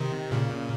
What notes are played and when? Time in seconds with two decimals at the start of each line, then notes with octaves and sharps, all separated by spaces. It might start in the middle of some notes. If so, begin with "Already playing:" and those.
Already playing: C3 D#3
0.32 A#2 C#3